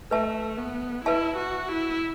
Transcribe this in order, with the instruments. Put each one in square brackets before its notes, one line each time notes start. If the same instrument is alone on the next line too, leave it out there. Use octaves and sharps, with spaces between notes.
[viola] A3 [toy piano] B4 E5 A5
[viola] B3
[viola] E4 [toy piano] B4 E5 A5
[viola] F#4
E4